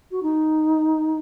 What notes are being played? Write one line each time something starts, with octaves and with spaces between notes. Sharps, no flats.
F#4
D#4